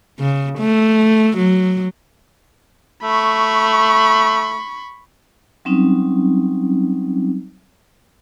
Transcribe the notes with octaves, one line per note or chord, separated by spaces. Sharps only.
C#3
A3
F#3
A3 B5 C#6
F#3 G3 C4 C#4 D#4